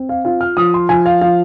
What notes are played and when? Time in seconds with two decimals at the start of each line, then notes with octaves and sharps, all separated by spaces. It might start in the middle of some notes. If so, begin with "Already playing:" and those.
Already playing: C4
0.09 F5
0.25 F4 F5
0.41 F6
0.57 F3 D#6
0.74 C6
0.89 F3 G#5
1.06 F5
1.21 F3 F5